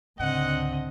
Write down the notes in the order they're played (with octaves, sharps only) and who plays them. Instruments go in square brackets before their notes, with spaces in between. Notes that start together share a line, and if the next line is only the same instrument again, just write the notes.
[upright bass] C#2 G#2 [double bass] D3 [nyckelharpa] C4 D#5 [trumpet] F#5